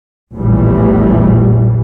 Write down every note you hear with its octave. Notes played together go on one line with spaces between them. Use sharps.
F1 A#1 E2 A2 E3 G3